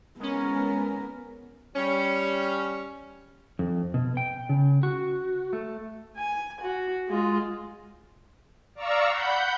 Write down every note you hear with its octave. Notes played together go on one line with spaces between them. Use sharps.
G#3 B3 C#4 A#4
G3 C#4
F2
B2
G5
C#3
F#4
A3
G#5
F#4
G#3 F4
D5 F5 A#5 C#6 E6
F#5 B5 G6